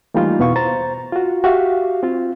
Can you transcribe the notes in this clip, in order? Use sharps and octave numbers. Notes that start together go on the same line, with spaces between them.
E3 G3 A3 A#3 D#4 F4
E2 B2 B3 E4 F5 C#6
C5 A#5 A6
F4 F#4
F#4 G4 E5 F5
C4 F4